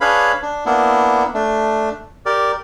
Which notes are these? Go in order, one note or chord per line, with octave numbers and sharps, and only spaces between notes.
D4 G#4 B4 C#5 F5 B5
D4
A#3 B3 D4 E4
A3 D4
G4 A#4 D5